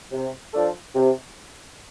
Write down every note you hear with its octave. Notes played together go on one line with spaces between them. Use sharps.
C3
F3 D4 A4 D5
C3